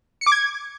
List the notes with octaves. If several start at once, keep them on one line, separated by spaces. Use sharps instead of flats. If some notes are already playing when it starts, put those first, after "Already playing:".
C#7
D6
G#6